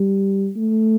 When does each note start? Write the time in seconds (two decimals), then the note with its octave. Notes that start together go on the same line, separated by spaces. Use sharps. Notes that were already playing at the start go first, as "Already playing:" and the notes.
Already playing: G3
0.56 A3